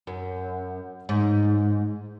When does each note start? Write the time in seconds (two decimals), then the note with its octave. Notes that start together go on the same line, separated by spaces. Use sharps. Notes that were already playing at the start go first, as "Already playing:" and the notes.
0.07 F#2
1.09 G#2